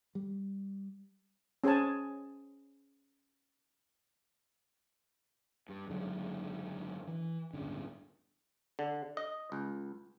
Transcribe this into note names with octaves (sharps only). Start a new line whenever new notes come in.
G3
C#4 G#4 C5 G#5 A5
G2
F#1 G#2 D3 F#3
E3
D1 G1 C#3 D4
D3
D#5
C#2